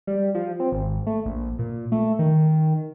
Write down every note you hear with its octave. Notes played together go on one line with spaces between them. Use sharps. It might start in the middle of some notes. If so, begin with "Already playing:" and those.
G3
F3
C4
G#1
A3
A#1
A#2
A3
D#3